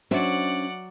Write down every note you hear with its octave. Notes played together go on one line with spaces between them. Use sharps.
F#3 C#4 D4 C5 D5 E5 F#5